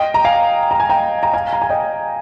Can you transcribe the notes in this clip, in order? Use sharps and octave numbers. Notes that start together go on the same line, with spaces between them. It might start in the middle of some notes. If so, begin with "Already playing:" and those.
Already playing: D#5 G5
A#5
F5 G#5
A#5
G#5
G5 A#5
A#5
F5 G#5
A#5
G#5
D#5 G5